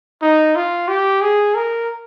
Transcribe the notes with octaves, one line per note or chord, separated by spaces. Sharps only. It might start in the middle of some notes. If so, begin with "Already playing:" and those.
D#4
F4
G4
G#4
A#4